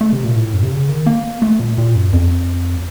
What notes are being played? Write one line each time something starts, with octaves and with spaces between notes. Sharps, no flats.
A3
C3
A#2
A2
F#2
C3
C#3
D#3
A#3
A3
A#2
A#2
F#2
F2